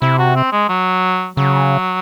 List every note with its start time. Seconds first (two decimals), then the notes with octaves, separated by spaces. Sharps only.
0.02 C3 E4
0.19 F#4
0.36 C4
0.53 G#3
0.69 F#3
1.37 C#3 F#3